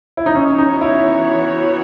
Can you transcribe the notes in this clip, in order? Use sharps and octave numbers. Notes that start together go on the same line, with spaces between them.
E4
D#4
E3 B3 C#4 F#4 C#5
D#4
E4